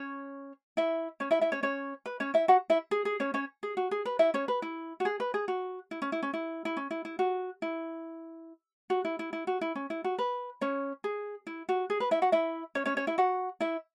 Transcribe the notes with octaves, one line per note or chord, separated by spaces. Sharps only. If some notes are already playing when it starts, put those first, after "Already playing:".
Already playing: C#4 C#5
E4 E5
C#4 C#5
E4 E5
E4 E5
C#4 C#5
C#4 C#5
B4
C#4 C#5
E4 E5
F#4 F#5
E4 E5
G#4
G#4
C#4 C#5
C#4 C#5
G#4
F#4
G#4
B4
E4 E5
C#4 C#5
B4
E4
F#4
G#4
B4
G#4
F#4
E4
C#4
E4
C#4
E4
E4
C#4
E4
E4
F#4
E4
F#4
E4
E4
E4
F#4
E4
C#4
E4
F#4
B4
C#4 C#5
G#4
E4
F#4
G#4
B4
E4 E5
F#4 F#5
E4 E5
C#4 C#5
C#4 C#5
C#4 C#5
E4 E5
F#4 F#5
E4 E5